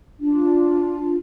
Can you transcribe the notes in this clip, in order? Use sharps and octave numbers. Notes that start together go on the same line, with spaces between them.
D4 F4